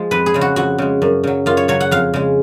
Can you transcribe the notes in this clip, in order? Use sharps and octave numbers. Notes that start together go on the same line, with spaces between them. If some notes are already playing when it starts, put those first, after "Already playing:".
Already playing: F3 G#3
F2 B4
G#4
C#3 G#3
F#4
F2 F#4
C#3 G#3
F#2
C#3 F#3
F#2 F4
C#5
C#3 F#3 C#5
F#5
F2 F5
C#3 G#3